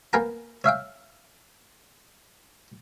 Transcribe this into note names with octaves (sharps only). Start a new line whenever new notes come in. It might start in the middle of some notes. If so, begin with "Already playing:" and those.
A#3 B3 A#4 G5 G#5 A#5
C#5 E5 F5 G5